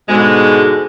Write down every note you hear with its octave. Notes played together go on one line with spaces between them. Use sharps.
G#2 B2 D3 G#3